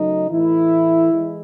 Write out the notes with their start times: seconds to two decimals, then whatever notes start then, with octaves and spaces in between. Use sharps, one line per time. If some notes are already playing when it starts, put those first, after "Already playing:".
Already playing: C#3 F#3 A3 D#4
0.31 A2 E3 A3 E4
1.13 E3 G#3